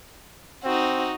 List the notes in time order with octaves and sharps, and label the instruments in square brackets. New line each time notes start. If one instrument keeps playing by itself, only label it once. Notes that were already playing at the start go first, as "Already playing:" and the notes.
[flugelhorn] C4 [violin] D#4 F#4